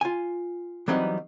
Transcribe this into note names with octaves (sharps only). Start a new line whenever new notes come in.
F4 G#5
E3 F#3 G3 B3 C4 D#4